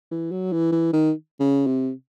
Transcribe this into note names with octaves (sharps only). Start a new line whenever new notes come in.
E3
F#3
E3
E3
D#3
C#3
C3